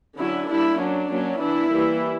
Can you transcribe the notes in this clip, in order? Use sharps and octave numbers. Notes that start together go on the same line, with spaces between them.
D3 F#3 C#4 E4
G3 A#3 D4 E4
F#3 C#4 D4
F#3 A#3 C#4
E3 B3 D4 E4
E3 G3 A#3